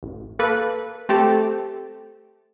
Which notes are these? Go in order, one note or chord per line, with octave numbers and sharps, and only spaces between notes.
A1
A#3 A4 B4
A3 C4 G4 A4